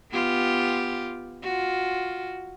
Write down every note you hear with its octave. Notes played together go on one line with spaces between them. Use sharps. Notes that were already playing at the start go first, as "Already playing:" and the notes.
B3 F4 G4
F4 F#4